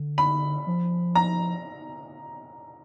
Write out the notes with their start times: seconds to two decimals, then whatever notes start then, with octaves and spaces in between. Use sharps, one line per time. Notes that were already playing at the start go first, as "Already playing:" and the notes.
Already playing: D3
0.18 B5
0.67 F3
1.15 A#5